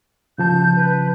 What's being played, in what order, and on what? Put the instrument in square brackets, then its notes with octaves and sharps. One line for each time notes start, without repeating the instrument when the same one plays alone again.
[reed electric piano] C#3 F3 A5 [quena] G6
[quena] B4